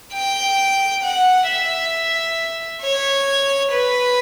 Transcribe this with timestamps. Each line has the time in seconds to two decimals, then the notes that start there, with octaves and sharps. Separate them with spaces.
0.14 G5
1.04 F#5
1.48 E5
2.82 C#5
3.72 B4